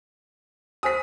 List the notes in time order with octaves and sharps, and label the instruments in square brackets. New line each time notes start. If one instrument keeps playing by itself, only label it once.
[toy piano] C5 G#5 E6 [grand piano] D#6 B6